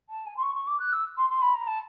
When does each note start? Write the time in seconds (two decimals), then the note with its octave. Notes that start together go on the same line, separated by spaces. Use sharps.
0.09 A5
0.26 G#5
0.36 C6
0.42 C#6
0.54 C#6
0.66 D6
0.79 F#6
0.92 E6
1.17 C6
1.29 C6
1.41 B5
1.54 A#5
1.66 A5